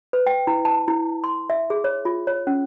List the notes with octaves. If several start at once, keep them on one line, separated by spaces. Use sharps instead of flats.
B4
G5
E4
A5
E4
C6
E5
G#4
C#5
F4
C#5
C#4